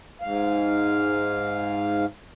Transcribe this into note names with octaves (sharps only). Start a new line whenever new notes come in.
G#2 F5